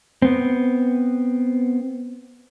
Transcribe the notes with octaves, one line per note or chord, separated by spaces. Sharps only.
B3 C4